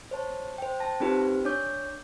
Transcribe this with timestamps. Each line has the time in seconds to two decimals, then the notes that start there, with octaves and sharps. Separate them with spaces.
0.11 C5 C#5 A5
0.58 C5 G5
0.80 A5 A#6
1.00 C4 D#4 F4 G4 B4 C5
1.45 D4 C#5 D6 G6